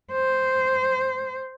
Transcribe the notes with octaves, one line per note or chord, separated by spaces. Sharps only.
C5